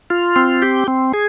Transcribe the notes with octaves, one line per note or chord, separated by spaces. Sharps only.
F4
C4
G4
C4
G#4